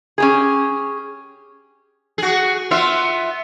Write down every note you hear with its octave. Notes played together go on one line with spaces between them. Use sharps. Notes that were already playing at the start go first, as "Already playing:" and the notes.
C#4 G4 G#4
F#4 G#4
B3 F4 E5